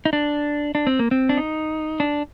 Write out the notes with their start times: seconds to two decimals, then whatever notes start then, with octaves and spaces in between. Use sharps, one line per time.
0.05 D#4
0.13 D4
0.75 D4
0.87 C4
0.99 A#3
1.11 C4
1.29 D4
1.37 D#4
2.00 D4